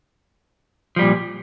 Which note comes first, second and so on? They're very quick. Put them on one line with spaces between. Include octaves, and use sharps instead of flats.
F3 G3 A#2